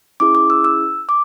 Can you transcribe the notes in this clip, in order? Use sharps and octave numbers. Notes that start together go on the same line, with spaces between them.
C#4 E4 G#4 D6
D6
E6
E6
D6